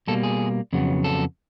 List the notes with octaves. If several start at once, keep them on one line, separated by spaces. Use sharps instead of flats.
B2 G3 A#3 A4
G#4
F2 C#3 F#3 B3
A4